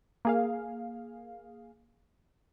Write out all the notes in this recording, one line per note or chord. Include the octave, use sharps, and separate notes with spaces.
A#3 G#4 F5